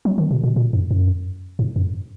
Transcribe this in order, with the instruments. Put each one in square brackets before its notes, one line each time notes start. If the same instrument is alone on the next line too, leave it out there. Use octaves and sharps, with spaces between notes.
[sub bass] F#3
D#3
B2
A#2
A#2
F#2
F#2
G#2
F#2